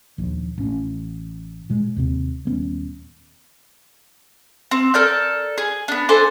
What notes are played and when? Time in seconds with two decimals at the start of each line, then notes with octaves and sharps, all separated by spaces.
0.18 A#1 D#2
0.58 A1 C#4
1.70 A#2 G#3
1.96 D#2 C3 C4
2.45 D#1 B3 C#4
4.71 C4
4.94 A4 A#4 D5 G6
5.58 G#4
5.88 B3 D4
6.09 D4 A4 C5 G#5